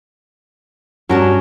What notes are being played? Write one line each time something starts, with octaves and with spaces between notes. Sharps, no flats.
G2 F#3 C#4 F#4 A#4 A5